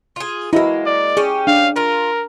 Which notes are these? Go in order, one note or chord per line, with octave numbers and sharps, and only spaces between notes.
F4 G#4
G#3 A#3 E4 F#4
D5
C#4 G4 G#4
D4 F5
F4 A#4